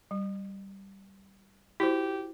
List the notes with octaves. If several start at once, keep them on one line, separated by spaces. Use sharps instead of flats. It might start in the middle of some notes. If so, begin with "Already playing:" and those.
G3
E4 F#4 G4 C5